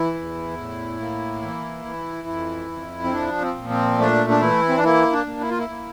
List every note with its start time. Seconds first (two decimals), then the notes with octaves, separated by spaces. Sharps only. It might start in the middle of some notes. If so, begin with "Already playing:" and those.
Already playing: E3 E4
0.14 E2
0.57 A2
1.00 A#3
1.42 E3
1.85 E3
2.28 F2
2.71 F2
3.04 C4
3.13 F3 D4
3.41 C4
3.56 A#2
3.70 C4
3.98 A3 D4
4.30 D4
4.41 E3 E4
4.69 C4
4.77 D4
4.84 A#3 E4
5.12 D4
5.27 A#3
5.41 E4
5.50 F4
5.58 E4
5.70 A#3